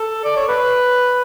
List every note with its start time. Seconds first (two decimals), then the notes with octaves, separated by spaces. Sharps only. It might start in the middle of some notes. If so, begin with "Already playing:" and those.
Already playing: A4
0.24 D5
0.36 C#5
0.48 B4